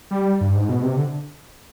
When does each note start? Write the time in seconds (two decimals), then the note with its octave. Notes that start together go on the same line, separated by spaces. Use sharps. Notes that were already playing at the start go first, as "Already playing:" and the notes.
0.11 G3
0.41 G2
0.55 G#2
0.69 B2
0.83 C3
0.97 D3